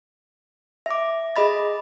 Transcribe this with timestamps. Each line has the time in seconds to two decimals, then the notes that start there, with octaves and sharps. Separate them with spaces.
0.86 E5 D6
1.36 G#4 D#5 B5 A6